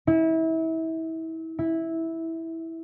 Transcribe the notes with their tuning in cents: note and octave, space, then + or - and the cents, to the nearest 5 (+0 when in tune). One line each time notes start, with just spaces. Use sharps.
E4 -30
E4 -10